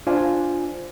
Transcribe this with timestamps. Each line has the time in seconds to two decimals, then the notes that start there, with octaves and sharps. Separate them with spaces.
0.07 D4 F4 C5 G#5